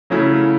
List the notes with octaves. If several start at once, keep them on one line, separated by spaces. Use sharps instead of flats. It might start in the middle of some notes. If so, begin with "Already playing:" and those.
C#3 F#3 A3 C#4 E4